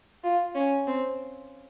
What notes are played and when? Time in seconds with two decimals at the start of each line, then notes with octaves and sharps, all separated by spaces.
0.24 F4
0.55 C#4
0.87 C4